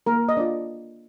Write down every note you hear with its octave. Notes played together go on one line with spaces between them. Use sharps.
A#3 A#4
D#5
D4 F4 D5